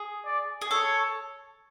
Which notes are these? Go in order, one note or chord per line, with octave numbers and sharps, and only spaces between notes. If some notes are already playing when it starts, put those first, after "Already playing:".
Already playing: G#4
D5
G#4
A4 C#5